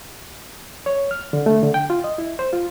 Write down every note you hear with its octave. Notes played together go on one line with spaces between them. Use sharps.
C#5
F6
D3
A3
D3
G5
F4
D#5
E4
C5
F4